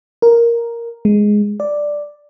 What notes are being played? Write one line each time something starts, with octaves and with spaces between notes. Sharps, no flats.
A#4
G#3
D5